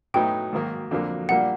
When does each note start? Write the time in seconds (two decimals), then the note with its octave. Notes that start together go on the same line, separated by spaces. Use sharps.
0.14 A2 F#3 B3 D#4 G5
0.52 G#2 D#3 F#3 A#3
0.91 F2 D3 F#3 A#3
1.29 A#2 G3 A#3 D4 F#5